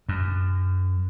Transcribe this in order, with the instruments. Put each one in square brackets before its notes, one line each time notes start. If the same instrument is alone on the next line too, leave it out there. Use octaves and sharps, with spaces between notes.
[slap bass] F#2